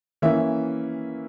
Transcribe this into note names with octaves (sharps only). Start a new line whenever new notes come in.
E3 A#3 C#4 E5